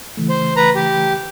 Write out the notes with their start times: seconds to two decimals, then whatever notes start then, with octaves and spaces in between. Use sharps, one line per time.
0.17 C#3 E3 A3
0.29 C5
0.56 B4 A#5
0.75 G4